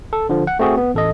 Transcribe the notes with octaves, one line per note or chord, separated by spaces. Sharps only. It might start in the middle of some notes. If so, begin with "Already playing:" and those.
A4
D3 F3
F#5
A3 C4 F#4 G#4
B3
A1 A4 D#5